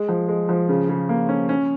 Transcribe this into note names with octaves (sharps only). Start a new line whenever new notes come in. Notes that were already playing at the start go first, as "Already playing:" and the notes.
Already playing: G#3
F3
G#3
F3
C#3
C#3
A#3
C#4
C#4